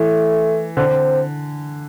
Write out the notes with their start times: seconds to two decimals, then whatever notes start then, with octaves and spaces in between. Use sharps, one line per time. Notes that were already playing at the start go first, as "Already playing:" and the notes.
Already playing: E3 A3
0.77 D3 C4